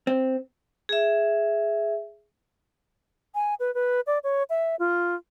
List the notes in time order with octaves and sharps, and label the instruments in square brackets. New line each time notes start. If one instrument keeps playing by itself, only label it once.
[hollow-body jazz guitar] C4
[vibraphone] G#4 E5
[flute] G#5
B4
B4
D5
C#5
E5
F4